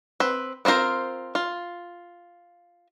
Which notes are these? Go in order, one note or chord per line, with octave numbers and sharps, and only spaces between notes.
C4 B4
B3 C4 F4 A#4 C5
F4